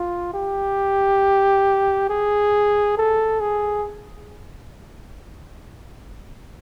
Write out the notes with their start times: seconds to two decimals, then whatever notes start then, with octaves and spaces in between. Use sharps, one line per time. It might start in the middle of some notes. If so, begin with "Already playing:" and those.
Already playing: F4
0.34 G4
2.10 G#4
2.98 A4
3.40 G#4